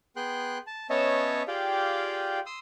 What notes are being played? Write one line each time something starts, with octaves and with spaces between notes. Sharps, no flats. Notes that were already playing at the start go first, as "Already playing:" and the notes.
B3 G#4 G5 C6 F#6
A5
B3 C#4 C#5 D#5 E5 A5
F4 G4 G#4 D5 F5 G5
C6 D#6 E6